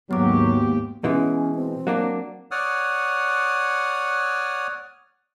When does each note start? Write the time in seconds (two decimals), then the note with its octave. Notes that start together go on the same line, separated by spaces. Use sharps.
0.11 D#2 G#2 F#3 B3 G4 D6
1.04 B2 E3 G#3 C#4
1.55 C4
1.87 F#3 A#3 D4
2.51 C#5 D5 F#5 D#6 F6